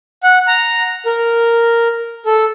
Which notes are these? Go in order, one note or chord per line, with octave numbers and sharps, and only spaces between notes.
F#5
A#5
A#4
A4